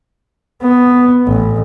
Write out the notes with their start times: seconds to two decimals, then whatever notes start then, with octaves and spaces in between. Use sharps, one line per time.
0.62 B3
1.27 A1